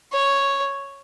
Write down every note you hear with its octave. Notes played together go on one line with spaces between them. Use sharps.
C#5